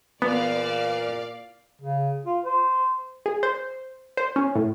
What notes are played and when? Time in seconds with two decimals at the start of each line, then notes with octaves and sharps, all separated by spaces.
0.22 E2 A#2 B3 D5 F5
1.81 C#3
2.25 F4
2.43 C5
3.26 G#4
3.43 C5
4.17 C5
4.36 C#4
4.55 A2